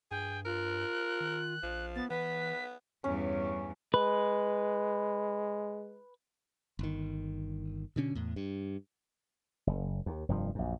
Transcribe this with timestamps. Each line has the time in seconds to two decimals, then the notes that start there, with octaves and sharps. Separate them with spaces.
0.11 G2 G#4 G5
0.45 F4 A#4 F#6
1.21 D#3
1.63 A#1 F3
1.95 B3 A6
2.10 E3 B3 B4 B6
3.04 E2 G2 C#4
3.94 G#3 B4
6.79 G1 D#3
7.96 B2 D3 C#4
8.15 E2 A2
8.36 G2
9.67 F#1
10.06 D#2
10.29 F1 G2 F3
10.55 A#1 F#2